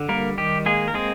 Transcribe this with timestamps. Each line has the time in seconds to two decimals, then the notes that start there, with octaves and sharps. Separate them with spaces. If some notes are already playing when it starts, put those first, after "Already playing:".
Already playing: D3
0.09 G3 A#3 A#4
0.38 D#3 G4
0.66 G#3 A#3 G#4
0.88 A#4
0.94 G#3 C4 G#4